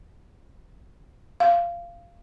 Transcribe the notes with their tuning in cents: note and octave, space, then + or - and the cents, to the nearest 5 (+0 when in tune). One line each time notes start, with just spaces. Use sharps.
F5 -15